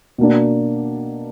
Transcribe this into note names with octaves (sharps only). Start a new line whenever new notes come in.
B2 A#3 D4